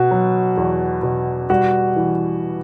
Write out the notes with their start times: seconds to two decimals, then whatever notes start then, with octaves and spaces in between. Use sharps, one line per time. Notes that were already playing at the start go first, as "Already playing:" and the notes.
Already playing: B2 F#4
0.11 F#3
0.57 E2
1.03 B2
1.50 G3 F#4
1.96 E3